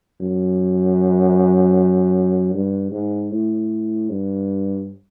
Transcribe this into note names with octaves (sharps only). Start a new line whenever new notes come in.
F#2
G2
G#2
A2
G2